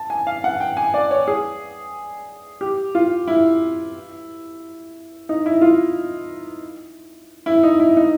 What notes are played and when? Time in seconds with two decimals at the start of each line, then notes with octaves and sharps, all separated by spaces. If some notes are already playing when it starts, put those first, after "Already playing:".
Already playing: A5
0.10 G#5
0.27 F5
0.44 F#5
0.60 G5
0.77 G#5
0.94 D5
1.11 C#5
1.28 G#4
2.61 G4
2.95 F4
3.27 E4
5.29 D#4
5.46 E4
5.61 F4
7.46 E4
7.63 D#4
7.80 E4
7.97 D#4